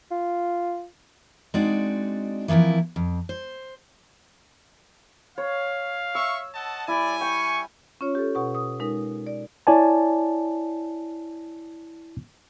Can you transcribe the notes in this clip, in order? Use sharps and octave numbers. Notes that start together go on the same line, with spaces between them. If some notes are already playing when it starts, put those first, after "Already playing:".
F4
G#3 C4 D4 D#4 F#4 D5
E3 F3 A#3 C4 E4
F2
C5
C#5 F5
E5 C#6 E6
D#5 F#5 A5
G3 E4 D5 G#5
G5 C#6
C#4 F4 C#5
G4 A4
B2 F#5 C#6
D#6
G#3 D#4 A#4
D5
E4 C#5 D5 G#5 A5